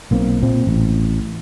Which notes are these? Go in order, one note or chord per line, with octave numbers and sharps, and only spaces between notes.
B1 A#3 C4
A#2 C4
A1